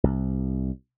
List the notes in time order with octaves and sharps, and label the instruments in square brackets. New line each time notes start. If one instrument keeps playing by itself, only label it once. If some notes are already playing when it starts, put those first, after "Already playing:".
[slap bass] C2